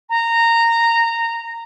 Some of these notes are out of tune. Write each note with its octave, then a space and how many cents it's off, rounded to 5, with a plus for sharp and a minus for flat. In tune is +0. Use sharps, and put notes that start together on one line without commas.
A#5 -15